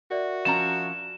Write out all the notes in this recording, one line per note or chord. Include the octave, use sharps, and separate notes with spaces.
F#4 A#4 D5 E5
F3 C#4 A#5 E7